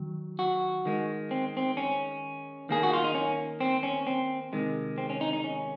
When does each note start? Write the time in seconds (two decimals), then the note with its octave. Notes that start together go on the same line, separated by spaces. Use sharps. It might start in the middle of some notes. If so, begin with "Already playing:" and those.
Already playing: D#3 F#3
0.39 F#4
0.85 D#3 G#3
1.31 C4
1.57 C4
1.77 C#4
2.69 D#3 A#3 G#4
2.83 F#4
2.93 F4
3.04 D#4
3.15 C#4
3.60 C4
3.83 C#4
4.07 C4
4.53 C3 D#3 G#3
4.98 C4
5.10 C#4
5.21 D#4
5.33 D#4
5.44 C#4